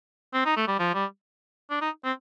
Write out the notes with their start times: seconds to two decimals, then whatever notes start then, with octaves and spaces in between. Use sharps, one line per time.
0.34 C4
0.45 D#4
0.56 A3
0.68 G3
0.79 F3
0.94 G3
1.70 D4
1.81 D#4
2.04 C4